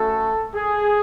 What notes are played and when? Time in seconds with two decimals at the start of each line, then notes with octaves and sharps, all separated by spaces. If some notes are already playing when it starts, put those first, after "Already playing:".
Already playing: A3 C#4 F#4 A4
0.55 G#4